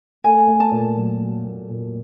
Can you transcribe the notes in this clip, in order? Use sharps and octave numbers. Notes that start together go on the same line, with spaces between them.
A3 G#5
A3
A5
A#2
F#3
F#3
A#2
A#2